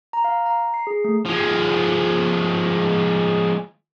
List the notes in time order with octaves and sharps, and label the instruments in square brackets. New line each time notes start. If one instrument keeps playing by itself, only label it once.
[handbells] A#5
F5
A#5
C7
G#4
A3
[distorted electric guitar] F3 G#3